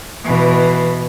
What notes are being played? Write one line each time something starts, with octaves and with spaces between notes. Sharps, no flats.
B2 E3